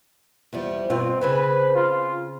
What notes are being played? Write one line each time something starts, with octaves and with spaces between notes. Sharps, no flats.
E2 F3 G3
G2 B2 C4 F4
C#3 C4 C#4 B4
F4